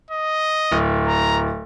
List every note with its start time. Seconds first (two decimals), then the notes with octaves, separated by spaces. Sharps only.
0.11 D#5
0.71 D1
1.08 A#5